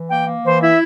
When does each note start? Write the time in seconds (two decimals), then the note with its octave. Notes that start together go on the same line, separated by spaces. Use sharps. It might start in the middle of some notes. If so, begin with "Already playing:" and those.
Already playing: E3
0.10 A#3 G5
0.27 A#3
0.45 E3 C5
0.62 E4 E5